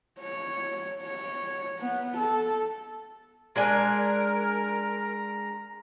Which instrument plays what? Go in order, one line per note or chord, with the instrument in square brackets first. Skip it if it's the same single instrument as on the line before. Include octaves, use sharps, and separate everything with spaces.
[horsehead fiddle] C#5
C#5
B3
A4
[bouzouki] G#3 D4 G#5 [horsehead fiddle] A#4 [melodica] A#5